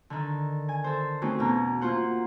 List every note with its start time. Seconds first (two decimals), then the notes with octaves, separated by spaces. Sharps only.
0.10 D3 D#3
0.69 G#5
0.84 A4 C5
1.22 A3 C4 C#4 D#4 F#4
1.39 E2 B2 A#5
1.81 A#3 F4 C5 F#5